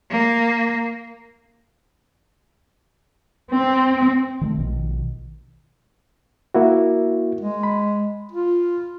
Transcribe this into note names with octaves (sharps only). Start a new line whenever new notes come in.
A#3
C4
D#3 G#3 A3
A#1 B2 D#3
A#3 E4 F#4
G#3
B5
F4